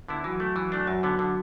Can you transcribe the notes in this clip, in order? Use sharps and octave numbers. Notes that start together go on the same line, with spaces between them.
D3 B3 E4
E3 F#3 F#4
A3 E4
E3
A3 D4
F#2 F#3 F#4
D3 B3
D3